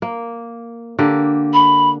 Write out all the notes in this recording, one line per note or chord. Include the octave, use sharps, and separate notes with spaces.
A#3
D3 A#3 G4
B5